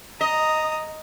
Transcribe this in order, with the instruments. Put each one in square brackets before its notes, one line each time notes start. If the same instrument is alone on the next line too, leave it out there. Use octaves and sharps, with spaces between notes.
[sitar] D#5 [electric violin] A#5 D#6